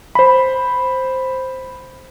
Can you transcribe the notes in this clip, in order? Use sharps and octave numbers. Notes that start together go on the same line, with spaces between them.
C5 B5